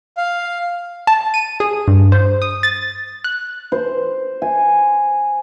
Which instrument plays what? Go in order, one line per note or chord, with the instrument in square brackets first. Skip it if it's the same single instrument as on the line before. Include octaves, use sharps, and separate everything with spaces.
[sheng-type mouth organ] F5
[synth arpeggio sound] A5
D#7
G#4
G2
C5
D#6
A6
F#6
[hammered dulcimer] C5
G#5